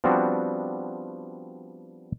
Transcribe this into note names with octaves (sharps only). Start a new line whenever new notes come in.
F3 G3 B3 C4 D4 F#4